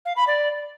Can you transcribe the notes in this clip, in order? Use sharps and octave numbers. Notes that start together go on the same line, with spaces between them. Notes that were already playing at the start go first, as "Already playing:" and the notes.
F5
B5
D5